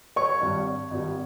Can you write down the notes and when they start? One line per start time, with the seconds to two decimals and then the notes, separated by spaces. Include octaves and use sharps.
0.16 C#5 C#6
0.41 G#1 G2 G3
0.90 G#1 G2 G3